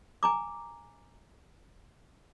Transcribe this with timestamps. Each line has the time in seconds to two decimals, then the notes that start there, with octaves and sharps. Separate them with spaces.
0.23 G#5 A#5 D6